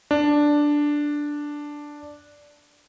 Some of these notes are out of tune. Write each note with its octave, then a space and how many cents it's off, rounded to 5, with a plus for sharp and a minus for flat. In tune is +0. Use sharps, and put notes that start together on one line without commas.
D4 +0